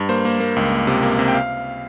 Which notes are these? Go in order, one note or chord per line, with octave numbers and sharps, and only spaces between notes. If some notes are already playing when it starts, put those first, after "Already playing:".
Already playing: G2
A#3 C5
A#3
A#3
C#2
A#3
C3
A#3
C3
G5
F5